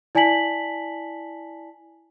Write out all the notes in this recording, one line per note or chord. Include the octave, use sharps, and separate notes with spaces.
E4 D5 G#5 A5 B6 F#7